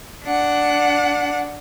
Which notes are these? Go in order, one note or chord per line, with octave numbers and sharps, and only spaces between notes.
D4 F#5